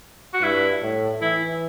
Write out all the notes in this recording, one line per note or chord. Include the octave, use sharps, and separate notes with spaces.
F#4
G2 E4
A2
E3 E4